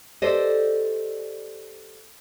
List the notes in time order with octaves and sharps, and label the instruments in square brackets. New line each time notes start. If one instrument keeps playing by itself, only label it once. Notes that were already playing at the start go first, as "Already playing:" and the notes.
[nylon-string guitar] G4 A4 C5 D5 D#5